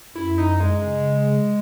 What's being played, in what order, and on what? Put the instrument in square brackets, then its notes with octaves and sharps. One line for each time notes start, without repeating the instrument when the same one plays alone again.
[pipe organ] F#2 [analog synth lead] E4
[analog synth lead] D#4
G#3
[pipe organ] C#3